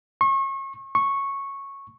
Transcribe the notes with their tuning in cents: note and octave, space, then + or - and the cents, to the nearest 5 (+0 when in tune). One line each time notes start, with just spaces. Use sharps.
C#6 -35
C#6 -10